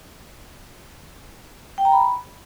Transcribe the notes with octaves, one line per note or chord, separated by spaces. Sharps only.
G5
A#5
B5